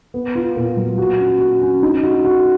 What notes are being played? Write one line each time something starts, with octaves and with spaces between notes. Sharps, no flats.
B3
F4
A#2
F#3
F#4
C#4
F#4
C#4
D#4
F#4
F#4